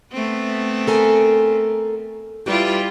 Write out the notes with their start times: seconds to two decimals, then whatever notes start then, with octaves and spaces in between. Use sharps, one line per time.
0.12 A3 B3 C4
0.88 A4 A#4 G#5
2.46 G3 E4 F4 G4 B4